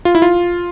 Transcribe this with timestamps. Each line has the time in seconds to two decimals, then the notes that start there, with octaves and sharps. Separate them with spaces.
0.05 F4
0.15 E4
0.22 F4